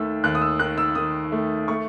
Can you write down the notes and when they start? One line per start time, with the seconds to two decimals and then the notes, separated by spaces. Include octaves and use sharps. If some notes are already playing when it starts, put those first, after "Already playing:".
Already playing: D#2 D#3 A3 E6
0.24 D#2 F#6
0.35 D#6
0.41 E6
0.59 D#3 F#6
0.78 E6
0.95 D#3 D#6
1.32 A3
1.68 A3 C#6